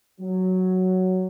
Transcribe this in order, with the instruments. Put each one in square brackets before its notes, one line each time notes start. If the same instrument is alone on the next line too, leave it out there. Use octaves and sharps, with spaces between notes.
[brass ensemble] F#3